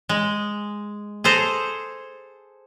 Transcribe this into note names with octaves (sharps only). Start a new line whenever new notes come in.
G#3
G#4 A4 C5 A#5